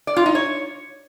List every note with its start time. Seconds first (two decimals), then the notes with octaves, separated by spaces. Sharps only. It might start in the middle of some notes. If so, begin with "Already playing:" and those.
0.07 D5
0.17 F4
0.26 D#4
0.35 C#5